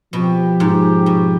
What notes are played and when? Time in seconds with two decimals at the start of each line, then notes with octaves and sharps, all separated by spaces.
0.13 B2 F3 C4 G4
0.60 G#2
1.06 B2